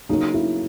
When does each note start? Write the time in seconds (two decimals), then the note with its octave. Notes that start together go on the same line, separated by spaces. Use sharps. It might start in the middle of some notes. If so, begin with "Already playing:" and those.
0.09 C#3 F#3 A#3 C#4 D#4
0.34 E4